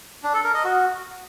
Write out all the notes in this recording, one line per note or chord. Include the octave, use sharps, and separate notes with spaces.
D4
A4
A#4
D#5
F#4